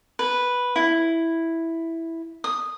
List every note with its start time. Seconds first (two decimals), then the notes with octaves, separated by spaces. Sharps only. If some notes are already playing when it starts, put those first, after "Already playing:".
0.19 B4
0.76 E4
2.44 D#6